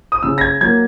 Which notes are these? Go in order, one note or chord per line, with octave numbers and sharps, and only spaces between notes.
D#6
C#3 E6
A#6
G#6
F#3 A#3 G#6